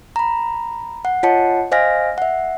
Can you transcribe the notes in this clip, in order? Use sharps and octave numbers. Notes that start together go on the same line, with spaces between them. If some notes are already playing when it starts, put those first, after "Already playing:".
A#5 B5
F#5
F4 C#5 D#5 F#5 A5 C#7
C5 D#5 F5 G#5 F6 A#6
E5 F#5